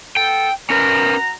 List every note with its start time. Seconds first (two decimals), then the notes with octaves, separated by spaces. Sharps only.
0.16 B3 A4 G5
0.70 C#4 F#4 A#4 B4 A#5